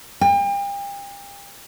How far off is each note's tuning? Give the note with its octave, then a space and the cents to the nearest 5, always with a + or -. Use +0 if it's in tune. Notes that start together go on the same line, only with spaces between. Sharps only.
G5 +40